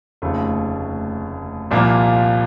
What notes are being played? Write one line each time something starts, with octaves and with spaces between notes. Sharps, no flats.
F1 D#2 C#3 A3
C2 A#2 F3 A#3